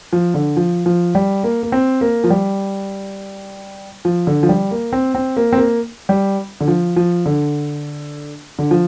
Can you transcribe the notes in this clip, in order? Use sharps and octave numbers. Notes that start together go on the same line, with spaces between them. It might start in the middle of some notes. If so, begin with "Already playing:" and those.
F3
D3
F3
F3
G3
A#3
A#3
C4
A#3
F3
G3
F3
D3
F3
G3
A#3
C4
C4
A#3
C4
A#3
G3
D3
F3
F3
D3
D3
F3